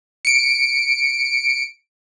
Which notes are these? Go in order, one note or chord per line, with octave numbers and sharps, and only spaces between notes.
C#7 D7